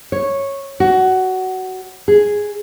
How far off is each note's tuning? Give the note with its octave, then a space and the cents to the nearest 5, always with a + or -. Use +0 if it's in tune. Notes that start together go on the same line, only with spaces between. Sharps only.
C#5 -10
F#4 +15
G#4 +0